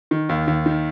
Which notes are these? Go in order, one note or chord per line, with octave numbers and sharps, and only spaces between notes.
D#3
D#2
D#2
D#3